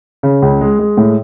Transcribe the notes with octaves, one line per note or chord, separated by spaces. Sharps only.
C#3
C#2
G#3
G#3
A2